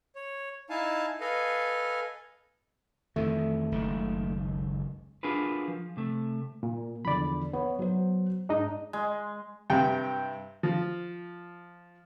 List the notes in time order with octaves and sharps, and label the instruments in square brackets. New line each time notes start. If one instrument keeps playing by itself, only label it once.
[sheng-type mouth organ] C#5
D#4 E4 F5 G#5 A5
A4 B4 D#5 F5 G#5
[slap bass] F2 D#3 E3 [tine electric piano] A3
[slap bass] F#1 C#2 D#3
[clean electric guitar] D4 F4 F#4 G#4 A#4 B4
F3
C3 A3
[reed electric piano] A#2
[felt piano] E2 D3 F3 [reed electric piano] D5 B5
[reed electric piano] B3 [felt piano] C#5
[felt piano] F#3 C5
[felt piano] G#2 [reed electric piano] D4 D#4 D#5
[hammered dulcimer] G#3
[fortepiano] G2 C3 G5
F3